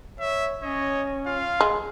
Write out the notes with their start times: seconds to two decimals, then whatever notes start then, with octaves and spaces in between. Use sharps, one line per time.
0.20 C#5 E5
0.63 C#4 C#5 D#5
1.27 F4 F5
1.61 G#3